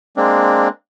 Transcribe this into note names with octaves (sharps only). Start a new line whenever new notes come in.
G#3 A#3 C4 D4